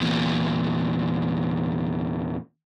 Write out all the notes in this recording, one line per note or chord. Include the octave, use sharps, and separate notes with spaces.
E2 A#2